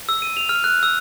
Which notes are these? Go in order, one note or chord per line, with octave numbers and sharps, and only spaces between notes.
E6
D#7
F7
F6
F#6
E6